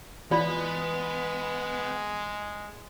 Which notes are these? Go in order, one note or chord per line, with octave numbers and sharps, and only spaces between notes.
E3 G#3 B3 F4 D5 B5